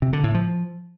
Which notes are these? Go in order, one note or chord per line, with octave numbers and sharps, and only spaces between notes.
C3
D3
A2
F3